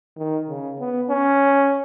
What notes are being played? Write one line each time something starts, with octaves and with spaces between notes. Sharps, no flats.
D#3
C#3
B3
C#4